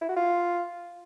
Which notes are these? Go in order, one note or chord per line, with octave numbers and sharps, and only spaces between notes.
E4
F#4
F4